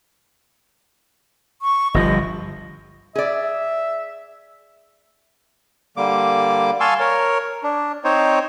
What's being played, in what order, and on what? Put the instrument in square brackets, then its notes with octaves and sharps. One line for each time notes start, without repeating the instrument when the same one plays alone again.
[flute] C#6
[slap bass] G1 F3 [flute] D#5
[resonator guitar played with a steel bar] G#4 D5 [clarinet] E5
[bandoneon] D3 G3 A#3 D6
F5 G#5 A5 C6 C#6 E6
A#4 C#5
D4
C4 D#4 C5 C#5